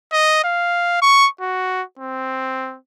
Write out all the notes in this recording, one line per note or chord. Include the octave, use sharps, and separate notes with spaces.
D#5
F5
C#6
F#4
C4